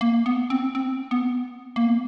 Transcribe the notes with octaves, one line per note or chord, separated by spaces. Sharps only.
A#3
B3
C4
C4
B3
A#3
B3